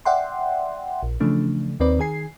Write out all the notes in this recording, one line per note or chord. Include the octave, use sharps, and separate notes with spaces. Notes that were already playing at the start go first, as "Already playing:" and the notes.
D5 E5 F#5 G5 C6
A#1
C#3 E3 F3 A3 D4
D#2 D#3 C4 B4 D5
D#3 G#4 G#5 C7